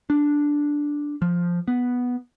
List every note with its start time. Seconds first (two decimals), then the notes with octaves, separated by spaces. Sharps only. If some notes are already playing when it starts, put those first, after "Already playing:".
0.10 D4
1.22 F3
1.68 B3